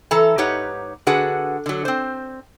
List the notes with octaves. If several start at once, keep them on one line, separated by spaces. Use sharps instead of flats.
E3 A4 A5 A#5
G#2 D#4 G4 B4 C#5 F#5
D3 D4 F#4 G#4 B4 F#5
D3 F#3
C4 C5